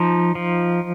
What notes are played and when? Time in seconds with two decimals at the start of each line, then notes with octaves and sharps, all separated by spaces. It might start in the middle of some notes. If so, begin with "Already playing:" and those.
Already playing: F3 D#4
0.35 F3